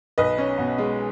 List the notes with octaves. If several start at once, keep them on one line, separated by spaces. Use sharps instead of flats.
B1 B4 D#5
C#4
B2
G#3